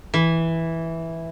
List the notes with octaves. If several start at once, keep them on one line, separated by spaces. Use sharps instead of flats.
E3